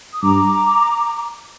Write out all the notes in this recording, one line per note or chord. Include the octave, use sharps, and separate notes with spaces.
D#6
G2 A#5 D6